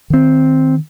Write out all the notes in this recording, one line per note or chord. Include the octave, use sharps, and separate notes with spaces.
D#3 C4